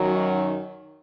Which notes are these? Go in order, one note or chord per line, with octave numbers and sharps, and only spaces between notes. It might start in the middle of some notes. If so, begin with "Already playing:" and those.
Already playing: F#2 D#3 F#3
D#4 F#4